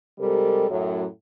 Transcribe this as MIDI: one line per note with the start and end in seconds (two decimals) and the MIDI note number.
0.20 0.68 48
0.20 0.68 55
0.20 0.68 56
0.20 0.68 69
0.20 0.68 70
0.69 1.04 42
0.69 1.04 45
0.69 1.04 54